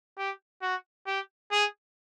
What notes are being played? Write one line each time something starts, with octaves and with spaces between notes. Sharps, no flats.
G4
F#4
G4
G#4